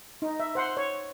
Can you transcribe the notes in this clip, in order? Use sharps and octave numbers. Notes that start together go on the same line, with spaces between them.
D#4
E5
C5 F#5 C6
C#5